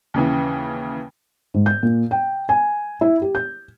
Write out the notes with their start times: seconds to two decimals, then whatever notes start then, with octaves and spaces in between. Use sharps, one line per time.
0.14 D#2 C#3 E3
1.54 G#2
1.66 G6
1.83 A#2
2.11 G5
2.49 G#5
3.01 E4
3.22 G4
3.35 G6